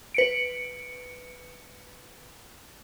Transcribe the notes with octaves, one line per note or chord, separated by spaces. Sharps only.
B4 C#7 D7